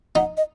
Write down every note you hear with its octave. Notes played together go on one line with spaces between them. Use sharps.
D#4 F#5
D#5